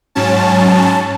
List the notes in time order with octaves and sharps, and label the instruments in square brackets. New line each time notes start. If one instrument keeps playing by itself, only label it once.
[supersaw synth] G#2 F#3 C#4 A5